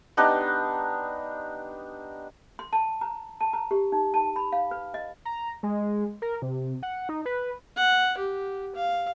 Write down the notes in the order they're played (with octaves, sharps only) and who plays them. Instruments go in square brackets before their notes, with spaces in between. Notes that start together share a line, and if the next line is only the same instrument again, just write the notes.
[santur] B3 D4 D#4 G4
[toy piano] C6
A5
A#5
A5
A#5
G4
D#4
A5
B5
F5
B4
D#5
[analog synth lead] A#5
G#3
A#4
C3
F#5
D#4
B4
[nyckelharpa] F#5
G4
F5